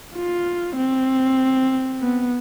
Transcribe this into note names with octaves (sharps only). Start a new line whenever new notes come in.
F4
C4
B3